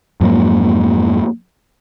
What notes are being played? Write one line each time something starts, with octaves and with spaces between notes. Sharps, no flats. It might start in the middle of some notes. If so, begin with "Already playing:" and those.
F2 G#2 F#3 A#3